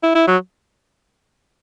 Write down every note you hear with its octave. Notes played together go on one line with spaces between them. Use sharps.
E4
E4
F#3